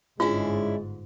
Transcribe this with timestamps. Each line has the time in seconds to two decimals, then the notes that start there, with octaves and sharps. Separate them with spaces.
0.20 G1 G#2 G#3 C#4 D4 E4 F4